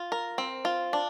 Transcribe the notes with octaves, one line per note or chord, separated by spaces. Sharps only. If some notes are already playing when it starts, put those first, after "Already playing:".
Already playing: F4
A#4
C4
F4
D4